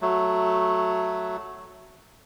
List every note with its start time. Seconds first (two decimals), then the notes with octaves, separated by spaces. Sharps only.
0.01 F#3 A3